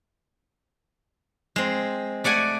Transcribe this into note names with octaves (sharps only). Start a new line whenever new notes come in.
G#3 C4
A3 D5 F#5 G#5